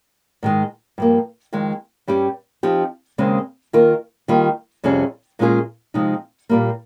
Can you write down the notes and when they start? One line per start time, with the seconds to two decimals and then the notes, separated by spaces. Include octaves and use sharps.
0.43 G#2 D#3 G#3
0.98 G2 F3 A#3
1.53 F2 D#3 G#3
2.08 G2 G3 C#4 G4
2.63 F3 C4 D#4 G4
3.18 D#2 C#3 G#3 C4
3.73 D#3 A#3 F4 A#4
4.28 D#3 G3 A#3 F4
4.84 F2 C3 G3 C#4 G#4
5.39 A#2 G#3 C#4 F4 G#4
5.94 C3 F3 G#3 D#4
6.49 A#2 G3 A#3